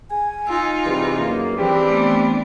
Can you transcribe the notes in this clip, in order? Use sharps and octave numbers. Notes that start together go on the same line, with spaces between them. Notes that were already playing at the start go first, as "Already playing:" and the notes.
G#4 G#5
D#4 F4 E6
C3 E3 G3 G#4 B4
F#2 A#3
E3 G3 C4 D4 G4
A3 B3